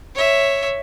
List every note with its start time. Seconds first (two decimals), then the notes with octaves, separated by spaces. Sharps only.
0.15 C#5 E5